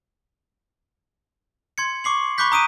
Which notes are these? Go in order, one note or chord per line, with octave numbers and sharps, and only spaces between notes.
C6 G#6 C#7
C#6 D6 C7 F#7
B5 C#6 D6 F#6 G6 B6
A#5 D#6 D7 D#7